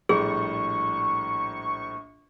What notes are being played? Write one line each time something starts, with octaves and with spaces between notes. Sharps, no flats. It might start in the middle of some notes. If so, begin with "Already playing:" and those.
A#1 A2 G3 G#4 C#6